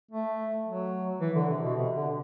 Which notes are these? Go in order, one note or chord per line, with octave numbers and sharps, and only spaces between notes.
A3
F#3
E3
D3
C3
B2
C3
D3